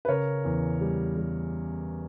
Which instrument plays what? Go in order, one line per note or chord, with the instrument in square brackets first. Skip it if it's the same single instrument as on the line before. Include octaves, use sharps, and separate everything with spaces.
[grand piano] B4
C#3 A#4 C#5
E2
G3
G3